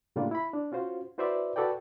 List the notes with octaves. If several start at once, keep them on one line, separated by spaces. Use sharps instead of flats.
A2 C#3 G3 A#3 D4 F4
E4 B5
D4
C#4 F4 F#4 C5
E4 F#4 B4 C5 D5 E5
F#4 A4 B4 D5 G5